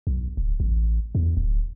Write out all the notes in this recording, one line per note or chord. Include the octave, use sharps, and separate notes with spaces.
B1
D1
A1
E2
D1